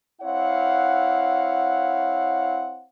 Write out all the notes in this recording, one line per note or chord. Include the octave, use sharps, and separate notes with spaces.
C4 E4 C#5 F5 F#5